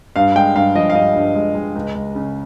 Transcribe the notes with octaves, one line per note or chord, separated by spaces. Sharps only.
G2 F5
G#3 G5
G2 F5
F3 D#5
F5
G2 D#5
G2
G#3
G#3
C#2
C#2
C#3